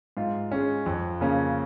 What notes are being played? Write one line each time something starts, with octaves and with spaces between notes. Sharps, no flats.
G#2 F4
G#3 C#4
F2
C#3 A#3 C#4